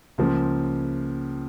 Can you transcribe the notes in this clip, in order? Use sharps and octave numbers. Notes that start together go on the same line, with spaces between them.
C#2 C#3 F3 A#3